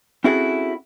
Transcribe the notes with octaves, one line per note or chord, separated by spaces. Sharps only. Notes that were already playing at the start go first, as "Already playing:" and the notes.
C4 C#4 E4 F#4 G#4 A4